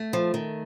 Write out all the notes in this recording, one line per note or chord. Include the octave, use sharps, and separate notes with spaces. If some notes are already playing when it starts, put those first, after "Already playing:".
Already playing: A3
F3
D#3